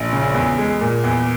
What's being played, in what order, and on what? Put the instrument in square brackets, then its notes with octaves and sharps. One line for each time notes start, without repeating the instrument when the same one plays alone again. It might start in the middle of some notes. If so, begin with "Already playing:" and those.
Already playing: [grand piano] A#1
C#3
E2
G#3
A#2
E2